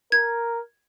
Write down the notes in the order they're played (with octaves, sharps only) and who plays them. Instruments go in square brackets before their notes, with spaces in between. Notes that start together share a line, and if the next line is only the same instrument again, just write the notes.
[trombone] A#4 [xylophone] G#6